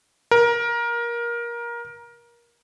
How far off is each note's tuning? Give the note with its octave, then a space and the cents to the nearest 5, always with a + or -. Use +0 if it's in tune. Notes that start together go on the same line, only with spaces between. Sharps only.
A#4 +20